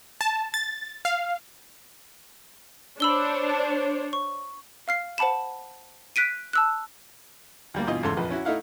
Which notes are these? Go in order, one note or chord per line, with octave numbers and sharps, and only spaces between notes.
A5
A6
F5
D4 C5 C#5 B5 E6 G7
C#6
F5 F6 C7
C5 F#5 A5 B5 E7
F#6 B6 D7 D#7
A5 E6 F#6
D2 G3 A#3
G2 B2 E3 F4 D#5
E2 G#2 C#3 A4 C6
A#1 F2 B4
C#4 E4 F#4
A3 D#4 E4 F5 F#5